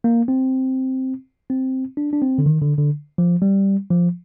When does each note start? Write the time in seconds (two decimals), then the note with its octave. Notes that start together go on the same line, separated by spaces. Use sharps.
0.04 A#3
0.28 C4
1.50 C4
1.97 D4
2.13 D4
2.22 C4
2.38 D3
2.46 D#3
2.62 D3
2.78 D3
3.18 F3
3.42 G3
3.91 F3